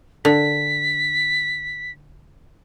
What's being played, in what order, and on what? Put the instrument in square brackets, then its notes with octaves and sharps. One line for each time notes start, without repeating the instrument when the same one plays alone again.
[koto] D3 [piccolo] B6